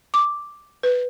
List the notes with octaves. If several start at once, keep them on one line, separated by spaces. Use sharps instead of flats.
D6
B4